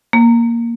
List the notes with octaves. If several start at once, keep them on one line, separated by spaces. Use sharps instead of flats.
A#3